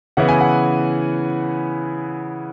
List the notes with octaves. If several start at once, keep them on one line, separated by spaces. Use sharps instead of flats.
C#3 E3 B3 E4 F#5
G#5
F#5